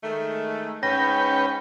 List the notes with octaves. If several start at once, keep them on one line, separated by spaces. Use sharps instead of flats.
D#3 G#3 A3
G#2 C#4 B4 G5 A#6